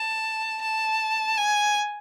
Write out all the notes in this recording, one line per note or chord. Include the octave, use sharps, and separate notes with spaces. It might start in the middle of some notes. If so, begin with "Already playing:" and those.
Already playing: A5
A5
G#5